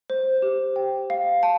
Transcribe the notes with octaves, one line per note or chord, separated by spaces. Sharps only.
C5
G4
G5
F5
A5